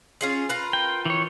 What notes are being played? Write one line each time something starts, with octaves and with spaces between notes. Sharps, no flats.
C#4 F4 G#4
F4 A#4 B4
G5
E3 C#5